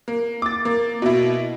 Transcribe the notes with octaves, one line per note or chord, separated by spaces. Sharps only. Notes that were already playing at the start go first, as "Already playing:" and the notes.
A#3
D6 A6
A#3
B2 E4